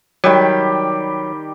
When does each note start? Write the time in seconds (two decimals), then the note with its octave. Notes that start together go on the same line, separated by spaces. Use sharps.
0.24 D#3 F#3 G3 G4